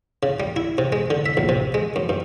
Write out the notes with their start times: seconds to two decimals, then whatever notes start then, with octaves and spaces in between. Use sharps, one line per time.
0.23 C#3
0.40 G3
0.56 E4
0.78 C3
0.92 G#3
1.10 D3
1.26 E5
1.37 A#1
1.49 C3
1.74 G#3
1.96 F#2
2.09 G2